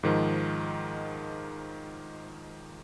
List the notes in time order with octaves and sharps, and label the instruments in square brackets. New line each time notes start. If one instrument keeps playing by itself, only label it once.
[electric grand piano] G#2 D#3 F3